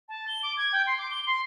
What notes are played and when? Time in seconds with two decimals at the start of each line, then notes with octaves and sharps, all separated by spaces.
0.09 A5
0.28 G7
0.43 D6
0.57 G#6
0.72 G5
0.87 C6
0.98 D6
1.11 G7
1.27 C6